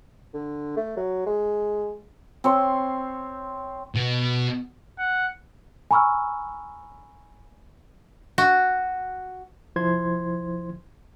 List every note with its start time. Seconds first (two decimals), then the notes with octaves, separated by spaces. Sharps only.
0.34 D3
0.77 A3
0.97 F#3
1.27 G#3
2.44 C4 C#5 C6
3.96 B2
4.99 F#5
5.91 G#5 A#5 B5 C#6 E6 F6
8.38 F#4
9.76 C2 F3 E4 C5 C6 G#6